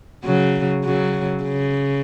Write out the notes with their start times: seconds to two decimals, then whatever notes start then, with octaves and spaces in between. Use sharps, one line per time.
0.24 C#3 F#3
0.85 C#3 F#3
1.43 C#3